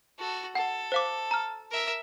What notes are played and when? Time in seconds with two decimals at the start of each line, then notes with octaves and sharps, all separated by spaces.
0.19 F#4 A4
0.55 A4 F#5
0.92 C5 F5 D6
1.31 A#5 F6
1.71 A#4 E5